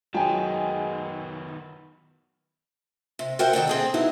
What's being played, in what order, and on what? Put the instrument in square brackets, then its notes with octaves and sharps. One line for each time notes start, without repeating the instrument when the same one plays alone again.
[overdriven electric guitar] D#3 B3 [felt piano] F#3 [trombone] G#3 [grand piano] G5 G#5
[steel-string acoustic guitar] C3
F#4 A#4 C5 E5 F#5 G5
D#3 A4 D5 G5
C4 G#4 A4
F#3 B3 D#4 E4